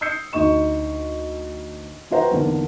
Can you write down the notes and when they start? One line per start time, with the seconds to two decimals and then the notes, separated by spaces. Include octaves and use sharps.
0.01 D#6 E6 G6 C7 C#7
0.33 D2 D#4 D#5 C#6 E7
2.11 C4 F#4 B4 C5 F#5 A#5
2.31 B1 E2 D3 A#3